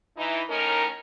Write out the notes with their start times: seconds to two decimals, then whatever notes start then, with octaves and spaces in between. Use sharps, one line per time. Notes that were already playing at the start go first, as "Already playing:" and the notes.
0.17 E3 D#4 E4
0.49 A2 C#4 D#4 A#4